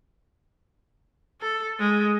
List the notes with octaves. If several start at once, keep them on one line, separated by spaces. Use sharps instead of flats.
A4
G#3